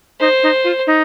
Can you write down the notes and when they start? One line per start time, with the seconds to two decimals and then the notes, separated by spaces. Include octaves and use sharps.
0.20 D#4 C5
0.43 D#4
0.64 F4
0.87 D#4